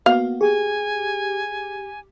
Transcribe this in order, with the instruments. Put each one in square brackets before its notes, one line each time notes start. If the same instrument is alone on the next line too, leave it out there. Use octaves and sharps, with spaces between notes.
[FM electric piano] A#3 B3 F#4 [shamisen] F5
[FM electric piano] G4 [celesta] G#4 [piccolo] G#5